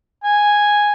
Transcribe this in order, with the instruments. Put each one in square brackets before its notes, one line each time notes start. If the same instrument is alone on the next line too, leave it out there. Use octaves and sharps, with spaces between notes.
[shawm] G#5